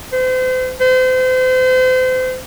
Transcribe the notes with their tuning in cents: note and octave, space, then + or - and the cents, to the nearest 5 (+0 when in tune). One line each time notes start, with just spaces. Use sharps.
C5 -40
C5 -35